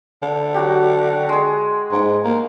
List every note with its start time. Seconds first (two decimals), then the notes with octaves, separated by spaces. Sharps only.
0.22 D3
0.54 F#3 F#4 G4
1.29 G#3 G#4
1.92 G#2
2.24 A#3